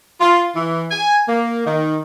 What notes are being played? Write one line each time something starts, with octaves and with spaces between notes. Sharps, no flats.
F4
E3
G#5
A#3
D#3